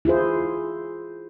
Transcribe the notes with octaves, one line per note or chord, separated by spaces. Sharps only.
E4 F4 G#4 C5